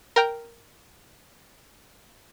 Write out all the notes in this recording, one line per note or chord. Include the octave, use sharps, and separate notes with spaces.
A#4 G5 A#5